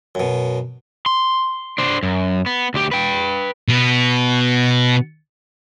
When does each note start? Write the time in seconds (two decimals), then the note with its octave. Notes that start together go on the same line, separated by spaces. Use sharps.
0.15 F#2 B2
1.06 C6
1.78 D4 C5
2.03 F#2
2.46 B3
2.74 D2 G4
2.91 B4 G5
3.68 B2 B3